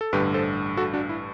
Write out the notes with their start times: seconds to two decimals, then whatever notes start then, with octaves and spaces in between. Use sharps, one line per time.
0.01 A4
0.13 A1 G2 D3 G4 B4
0.34 A4 C5
0.77 F#4 A4
0.94 D4 F#4
1.09 E4